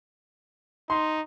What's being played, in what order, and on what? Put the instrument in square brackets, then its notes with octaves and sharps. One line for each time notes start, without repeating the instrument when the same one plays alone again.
[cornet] D#4 [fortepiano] C6